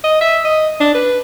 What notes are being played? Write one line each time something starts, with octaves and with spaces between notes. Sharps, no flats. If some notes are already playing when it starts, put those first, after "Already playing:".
D#5
E5
D#5
D4
B4